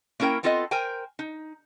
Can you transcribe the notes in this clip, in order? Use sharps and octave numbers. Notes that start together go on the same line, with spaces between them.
A#3 C#4 E4 A#4 G5
B3 C4 F4 A4 B4 D#5
A#4 C5 G5 G#5
D#4